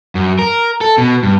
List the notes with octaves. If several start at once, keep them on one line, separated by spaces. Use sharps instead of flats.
F#2
A#4
A4
B2
G2